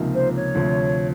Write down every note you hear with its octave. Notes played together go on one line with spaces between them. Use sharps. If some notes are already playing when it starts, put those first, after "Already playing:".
Already playing: C#2 C3 F3 A#3 D#4
C5
C#5
D2 C3 F3